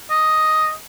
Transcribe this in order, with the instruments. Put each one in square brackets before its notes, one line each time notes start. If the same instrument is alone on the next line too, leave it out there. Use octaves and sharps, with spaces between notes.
[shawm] D#5